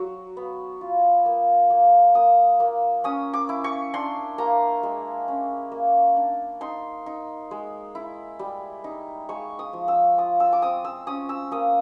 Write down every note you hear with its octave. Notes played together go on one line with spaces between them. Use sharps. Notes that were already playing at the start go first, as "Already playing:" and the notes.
Already playing: F#3 C#6
B3
F4
A#3
A#3
A#3 D#6
A#3
C#4 D#6
D6
E4
C#6
D4 C6
A#3 A#5
G#3
C#4
A#3
D4
D#4 C6
D#4
G#3
E4
G3
D#4
G#3 C#6
D#6
F3
E6
F4 D#6
E6
D6
C4 D#6
E6
C#4 D#6
E6
A#3 D#6